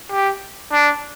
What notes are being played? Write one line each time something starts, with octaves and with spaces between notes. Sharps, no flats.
G4
D4